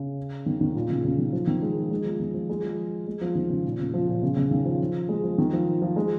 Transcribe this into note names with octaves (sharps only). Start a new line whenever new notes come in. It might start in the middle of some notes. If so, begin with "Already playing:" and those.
Already playing: C#3
D#3
D#3
A#2
C#3
C#3
D#3
F3
D#3
G#3
F3
G#3
F3
D#3
F3
G#3
F3
G#3
F3
D#3
C#3
A#2
C#3
F3
A#2
C#3
C#3
D#3
F3
G#3
F3
D#3
F3
F3
G#3